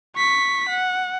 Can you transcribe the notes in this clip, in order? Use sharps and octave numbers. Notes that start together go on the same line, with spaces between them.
C#6 B6
F#5